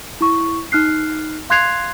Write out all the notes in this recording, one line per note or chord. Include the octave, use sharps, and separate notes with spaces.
E4 C#6
D#4 F6 F#6 C7
F5 C6 F#6 G#6 C7 F7